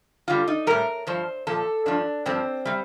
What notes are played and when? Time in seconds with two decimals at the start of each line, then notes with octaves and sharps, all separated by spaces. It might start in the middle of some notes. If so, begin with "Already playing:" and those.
0.28 G2 D3 G3 F4
0.48 D#4
0.67 A2 G3 A#4
1.07 G2 F3 C5
1.47 A#2 F3 A4
1.86 G2 F3 D4
2.26 G2 F3 C4
2.65 C3 G3